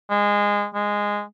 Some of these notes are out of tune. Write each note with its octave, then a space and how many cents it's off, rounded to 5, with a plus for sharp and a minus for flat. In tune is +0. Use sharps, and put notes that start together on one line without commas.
G#3 -20
G#3 -10